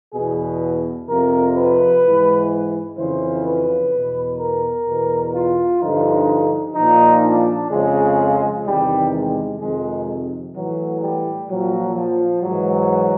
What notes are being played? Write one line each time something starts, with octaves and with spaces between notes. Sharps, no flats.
E2 B2 G#4
F2 C3 F3 A#4
B4
G#2 E3
F2 C#3 E3 C5
B4
E2 B2
A#4
E2 B2
F4
G2 D3 F3 D#4
A#2 F3 D#4
D4
F2 C#3 F3 G#3
E2 C3 D#3 G3
G#3
F2 C3 D#3 G#3
A2 E3 F#3
G3
A#2 F3 F#3
F3
G#2 E3 F#3